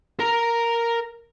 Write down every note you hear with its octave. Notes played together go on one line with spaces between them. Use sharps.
A#4 A#5